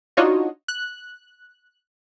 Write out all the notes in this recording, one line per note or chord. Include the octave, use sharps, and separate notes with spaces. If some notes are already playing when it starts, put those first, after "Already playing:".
D4 D#4 F4 F#4 C#5 D#5
F#6